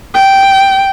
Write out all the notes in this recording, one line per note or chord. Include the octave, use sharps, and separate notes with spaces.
G5